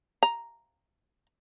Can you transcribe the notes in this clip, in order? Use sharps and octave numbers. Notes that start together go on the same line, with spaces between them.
A#5